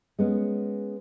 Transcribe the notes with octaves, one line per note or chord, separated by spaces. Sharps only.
G#3 B3 C#4